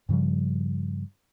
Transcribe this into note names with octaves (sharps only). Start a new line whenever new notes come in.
G2 C#3 F3 G3